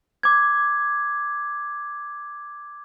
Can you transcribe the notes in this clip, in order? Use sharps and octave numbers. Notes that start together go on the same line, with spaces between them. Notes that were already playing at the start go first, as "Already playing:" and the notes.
D6 G#6